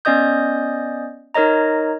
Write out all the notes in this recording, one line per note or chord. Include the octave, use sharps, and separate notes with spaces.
B3 C#4 D5 D#5 D#6 G6
D#4 A#4 C#5 D#5 A#5